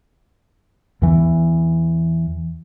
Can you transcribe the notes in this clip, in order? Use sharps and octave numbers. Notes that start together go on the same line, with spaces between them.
E2 E3